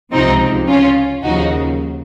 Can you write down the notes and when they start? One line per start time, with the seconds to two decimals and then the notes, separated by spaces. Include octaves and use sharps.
0.12 C#2 C3 F3 C4 D#4
0.68 C#4 F4
1.23 D#2 C#3 F3 D#4 F#4